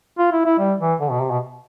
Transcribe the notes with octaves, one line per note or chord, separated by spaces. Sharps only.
F4
E4
E4
G3
E3
D3
B2
C3
B2